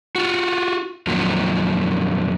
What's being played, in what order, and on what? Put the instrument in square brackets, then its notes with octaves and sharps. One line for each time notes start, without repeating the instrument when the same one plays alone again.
[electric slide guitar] F4 F#4
F2 A#2 D#3 F#3